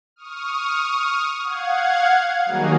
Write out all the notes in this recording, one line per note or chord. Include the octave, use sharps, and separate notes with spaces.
C#6 D#6 F6
F5 F#5 G#6
D#3 F#3 G3 A#3 D#4 G#4